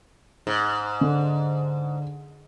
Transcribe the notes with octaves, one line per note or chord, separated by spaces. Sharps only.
G#2
D3